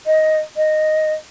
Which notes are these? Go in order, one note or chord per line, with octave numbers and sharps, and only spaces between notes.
D#5
D#5